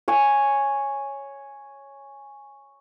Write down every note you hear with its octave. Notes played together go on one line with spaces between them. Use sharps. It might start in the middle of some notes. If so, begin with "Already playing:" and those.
C#5 G#5